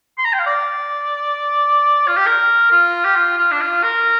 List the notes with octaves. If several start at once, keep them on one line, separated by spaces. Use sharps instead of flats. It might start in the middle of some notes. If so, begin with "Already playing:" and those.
C6
A#5
G5
F5
D5
F4
G4
A#4
F4
G4
F4
F4
D4
F4
A#4